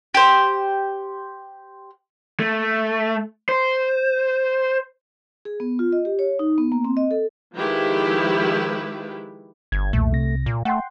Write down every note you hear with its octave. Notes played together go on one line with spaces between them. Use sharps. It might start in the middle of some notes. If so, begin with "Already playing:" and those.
G4 C5
A3
C5
G#4
B3
F4
D#5
G4
C#5
D#4
B3
A#3
C4
D#5
A4
D#3 F3 G#3 E4 G4 B4
G1 G#6
B1 E2 A#2 A3
C2 C3 A#6
A#2
A3 F#5 G5 C6